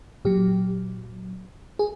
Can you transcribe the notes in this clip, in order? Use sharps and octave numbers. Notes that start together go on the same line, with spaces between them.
A#2 F#3 G4
G#4